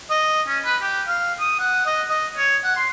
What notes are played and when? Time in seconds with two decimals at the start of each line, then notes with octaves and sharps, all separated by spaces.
0.10 D#5
0.47 C#4
0.64 B4
0.82 G4
1.07 F5
1.40 D#6
1.59 F#5
1.86 D#5
2.09 D#5
2.37 C#5
2.64 F#5
2.76 C6